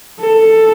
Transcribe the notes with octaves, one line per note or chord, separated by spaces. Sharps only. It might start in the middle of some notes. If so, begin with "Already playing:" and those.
A4